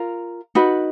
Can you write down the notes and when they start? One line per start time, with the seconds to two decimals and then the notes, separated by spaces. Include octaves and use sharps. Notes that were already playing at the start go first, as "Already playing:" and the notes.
Already playing: F4 A#4
0.55 D#4 F#4 B4